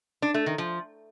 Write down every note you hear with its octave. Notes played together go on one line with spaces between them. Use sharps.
D4
A3
D#3
F3